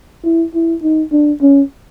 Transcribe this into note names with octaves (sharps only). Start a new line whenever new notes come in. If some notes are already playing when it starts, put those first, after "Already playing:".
E4
E4
D#4
D4
C#4